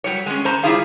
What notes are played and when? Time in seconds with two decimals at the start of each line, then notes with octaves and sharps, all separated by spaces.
0.04 F#3 G3 C#5
0.26 G#3 B3 C#4
0.44 C#4 C5 A#5
0.63 G3 G#3 E4 F4 G#4 F5